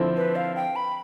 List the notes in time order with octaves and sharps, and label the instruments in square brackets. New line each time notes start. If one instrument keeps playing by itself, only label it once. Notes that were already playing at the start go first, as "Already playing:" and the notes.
Already playing: [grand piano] D3 F3 C4 E4
[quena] B4
F5
G5
B5